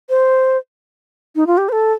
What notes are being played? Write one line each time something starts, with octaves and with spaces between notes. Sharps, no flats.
C5
D#4
F4
G4
C5
A4